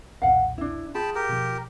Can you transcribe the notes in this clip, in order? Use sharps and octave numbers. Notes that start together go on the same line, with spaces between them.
B1 E2 A#2 F5 F#5
D4 E4
F4 G#4 G5 A5 B5 C6 D#6
G4 A#4
B2 F3